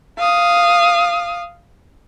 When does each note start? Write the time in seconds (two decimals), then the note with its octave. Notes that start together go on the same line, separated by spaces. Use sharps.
0.18 F5 D#6